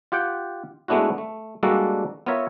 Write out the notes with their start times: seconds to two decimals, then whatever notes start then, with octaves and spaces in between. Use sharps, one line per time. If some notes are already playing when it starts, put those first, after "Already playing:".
0.12 F4 G4 F#5 G5
0.88 G#3 A3 B3 D4 E4 F#4
1.18 A3
1.63 G3 G#3 A#3 D4 F#4 A4
2.26 B3 F4 A#4 C#5 E5